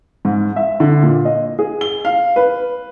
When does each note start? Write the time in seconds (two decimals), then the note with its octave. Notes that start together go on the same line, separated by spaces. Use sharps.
0.25 G#2
0.56 E5
0.80 D3
1.02 A#2
1.25 D#5
1.59 G#4
1.81 G7
2.05 F5
2.36 B4